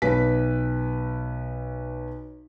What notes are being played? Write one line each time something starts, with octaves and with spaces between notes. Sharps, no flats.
B1 B4 B6